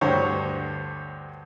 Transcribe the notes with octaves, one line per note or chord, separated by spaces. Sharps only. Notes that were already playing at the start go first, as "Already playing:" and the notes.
D2 G2 D3 C5 C#5